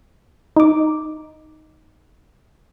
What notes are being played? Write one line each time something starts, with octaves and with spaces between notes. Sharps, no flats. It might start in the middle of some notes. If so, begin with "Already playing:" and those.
D#4 D6